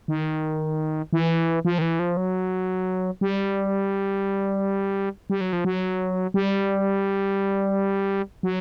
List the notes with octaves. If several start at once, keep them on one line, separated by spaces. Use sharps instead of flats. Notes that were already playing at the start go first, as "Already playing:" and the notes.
D#3
E3
F3
D#3
E3
F3
F#3
G3
G3
F#3
F3
F#3
G3
F#3